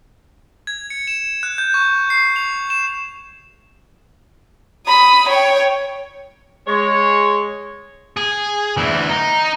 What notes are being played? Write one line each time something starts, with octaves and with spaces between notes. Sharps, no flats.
G#6
C#7
E7
F#6
G6
C#6
C7
F7
E7
B5 D#6
C#5 G5
G#3 C#5
G#4
D2 E3
D#4